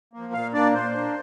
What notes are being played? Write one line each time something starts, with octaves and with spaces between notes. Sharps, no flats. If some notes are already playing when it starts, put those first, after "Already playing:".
F3 A#3
A#2 F5
A#3 D4 D5
A#2 C5
A#3 D4